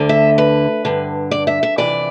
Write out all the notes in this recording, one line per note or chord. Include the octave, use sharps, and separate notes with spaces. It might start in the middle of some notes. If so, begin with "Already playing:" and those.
Already playing: D2 D3
E5
B4
G2 D3
D5
E5
E5
F2 C3 E3 D5